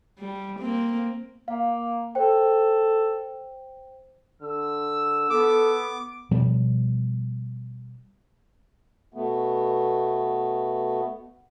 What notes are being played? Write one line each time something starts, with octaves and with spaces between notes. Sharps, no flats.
G3
A#3 C4
A#3 F5
A4 C5 G5
D3 E6
B3 A4 D6
B2 F3 G3 B3
B2 A3 B3